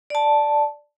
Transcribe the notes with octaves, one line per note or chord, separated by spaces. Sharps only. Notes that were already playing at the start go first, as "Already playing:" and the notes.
D5 A5